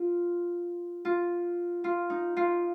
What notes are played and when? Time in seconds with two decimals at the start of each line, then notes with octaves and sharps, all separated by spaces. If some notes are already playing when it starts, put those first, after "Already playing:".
Already playing: F4
1.05 F4
1.84 F4
2.10 D#4
2.37 F4